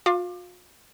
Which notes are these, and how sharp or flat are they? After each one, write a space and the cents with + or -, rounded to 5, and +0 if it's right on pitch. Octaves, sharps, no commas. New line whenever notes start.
F4 +45 F5 +0 D6 +25